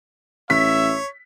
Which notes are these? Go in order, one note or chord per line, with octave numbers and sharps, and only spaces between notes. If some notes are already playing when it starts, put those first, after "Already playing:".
A1 C#5 E5 B6